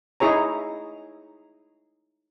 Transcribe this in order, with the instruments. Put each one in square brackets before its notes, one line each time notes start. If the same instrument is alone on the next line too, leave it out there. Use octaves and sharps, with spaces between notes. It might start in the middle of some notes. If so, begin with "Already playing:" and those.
[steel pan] D#4 E4 G#4 C#5 A#5